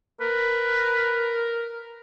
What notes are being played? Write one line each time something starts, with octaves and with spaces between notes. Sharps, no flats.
A#4 B4